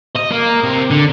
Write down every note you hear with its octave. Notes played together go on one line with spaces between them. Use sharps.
D#5
A#3
C3
D3